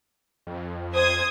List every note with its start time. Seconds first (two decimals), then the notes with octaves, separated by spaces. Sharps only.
0.47 F2
0.92 C5 D#6 G#6